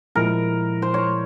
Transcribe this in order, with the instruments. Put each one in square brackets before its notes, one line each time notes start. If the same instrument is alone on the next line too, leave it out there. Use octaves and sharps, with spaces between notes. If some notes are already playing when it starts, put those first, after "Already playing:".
[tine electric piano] A#2 F3 G#3 E4 [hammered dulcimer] A#4
[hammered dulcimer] C5
C#5